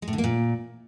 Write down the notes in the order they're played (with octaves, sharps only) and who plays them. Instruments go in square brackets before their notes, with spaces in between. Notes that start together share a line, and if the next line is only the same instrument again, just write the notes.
[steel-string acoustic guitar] G#3
A2
D3
A#3
A#2